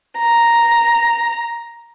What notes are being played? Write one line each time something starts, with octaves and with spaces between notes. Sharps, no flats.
A#5